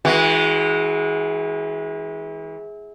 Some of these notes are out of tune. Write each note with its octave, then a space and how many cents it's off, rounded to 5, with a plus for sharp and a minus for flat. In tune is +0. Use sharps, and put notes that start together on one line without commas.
E3 -30 G#3 +0 F#4 +0